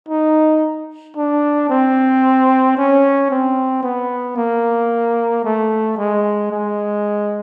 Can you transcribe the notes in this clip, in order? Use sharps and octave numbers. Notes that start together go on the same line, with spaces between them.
D#4
D4
C4
C#4
C4
B3
A#3
A3
G#3
G#3